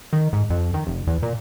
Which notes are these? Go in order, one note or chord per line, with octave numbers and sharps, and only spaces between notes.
D#3
G#2
F2
D#3
F1
E2
A#2